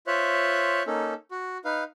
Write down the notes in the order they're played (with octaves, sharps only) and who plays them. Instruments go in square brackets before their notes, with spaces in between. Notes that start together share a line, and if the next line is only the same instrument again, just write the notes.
[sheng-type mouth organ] F4 C5 C#5 E5 F#6
A#3 C#4 D#4 A4
F#4
D#4 B4 F5